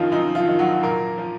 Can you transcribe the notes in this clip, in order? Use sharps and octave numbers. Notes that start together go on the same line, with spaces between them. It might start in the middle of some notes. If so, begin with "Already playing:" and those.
Already playing: F#2 D#3 F3 C#4 D#4 F4
F#2 D#4
F3 F4
D#3
F#3 F#4
A#2 A#3 A#4
F3